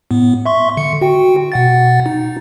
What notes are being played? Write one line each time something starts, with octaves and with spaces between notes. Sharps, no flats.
A2 B3
E5 C6 C#6
D3 C#7
F#4 G5
B2 F#5 A6
D#4